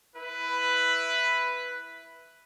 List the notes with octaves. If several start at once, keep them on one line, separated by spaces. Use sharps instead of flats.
E4 B4